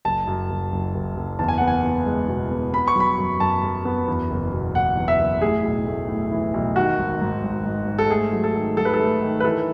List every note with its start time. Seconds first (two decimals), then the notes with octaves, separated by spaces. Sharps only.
0.05 F#1 A5
0.27 F#2
0.50 F#1
0.72 F#1
0.94 F#1
1.17 F#1
1.39 E2 A5
1.48 G#5
1.58 B3 F#5
1.67 G#5
1.84 B3
2.06 G#3
2.28 B2
2.51 B3
2.73 B3 B5
2.88 C#6
2.95 F#3 B5
3.18 F#2
3.40 F#2 A5
3.63 F#2
3.85 B3
4.08 E2
4.30 F#1
4.52 B2
4.75 F#1 F#5
4.97 E2
5.08 E5
5.19 F#1
5.42 A2 G#4
5.64 B1
5.87 A3
6.09 A2
6.31 E3
6.54 B1
6.76 D#3 F#4
6.99 G#1
7.21 G#2
7.43 G#1
7.66 G#2
7.88 G#2
7.98 A4
8.10 A3 G#4
8.33 F#3
8.44 A4
8.55 D#3
8.77 F#3 A4
8.85 B4
8.94 A4
8.99 A3
9.22 D#3
9.40 B4
9.44 E3 A4